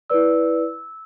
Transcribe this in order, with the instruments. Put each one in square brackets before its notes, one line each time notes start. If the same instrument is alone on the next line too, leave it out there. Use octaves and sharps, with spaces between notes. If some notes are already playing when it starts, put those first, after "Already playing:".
[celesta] E4 B4 D5 E6